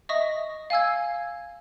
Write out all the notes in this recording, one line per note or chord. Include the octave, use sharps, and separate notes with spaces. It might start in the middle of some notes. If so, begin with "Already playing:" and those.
D#5 E5 C#6 D#6 A#6
F5 G#5 E6 G#6